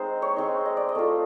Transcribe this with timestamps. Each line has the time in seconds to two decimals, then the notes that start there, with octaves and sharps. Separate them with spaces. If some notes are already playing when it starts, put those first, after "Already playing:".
Already playing: G#3 C4 D#4 C5
0.22 C#5
0.36 G#3 C4 D#4
0.65 D#5
0.77 D5
0.89 D#5
0.95 A3 C4 F4